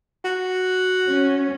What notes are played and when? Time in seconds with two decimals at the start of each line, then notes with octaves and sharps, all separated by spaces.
0.24 F#4
1.08 C#4